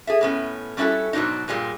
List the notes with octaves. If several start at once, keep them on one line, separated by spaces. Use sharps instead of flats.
G#4 A4 E5
A2 B3 C#4
G3 C#4 D4 E4 F#4 A4
G#2 B2 F#3 D4 D#4
G2 A#2 G3 G#3